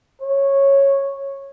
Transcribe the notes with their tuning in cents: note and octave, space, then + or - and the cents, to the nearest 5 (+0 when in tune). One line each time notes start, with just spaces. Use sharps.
C#5 -10